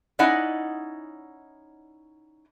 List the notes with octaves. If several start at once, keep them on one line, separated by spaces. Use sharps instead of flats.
C#4 D#4 E4 D5 D#5 F#5